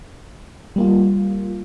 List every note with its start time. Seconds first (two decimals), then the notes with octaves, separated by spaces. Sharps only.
0.76 G3 A#3 F4